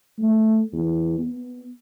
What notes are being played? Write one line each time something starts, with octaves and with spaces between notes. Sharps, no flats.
A3
E2
B3